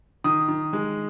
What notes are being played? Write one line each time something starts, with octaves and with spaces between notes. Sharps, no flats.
D#3 D#6
D#3
G#3